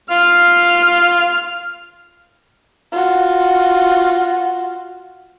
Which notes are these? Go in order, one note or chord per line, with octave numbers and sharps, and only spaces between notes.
F4 F6
F4 F#4